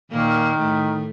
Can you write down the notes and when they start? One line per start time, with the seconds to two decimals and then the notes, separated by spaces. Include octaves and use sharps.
0.11 A#2 D#3 A#3
0.59 A2 A3